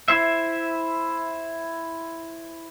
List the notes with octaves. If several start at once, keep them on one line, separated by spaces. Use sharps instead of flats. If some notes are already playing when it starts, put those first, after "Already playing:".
E4 C5 E5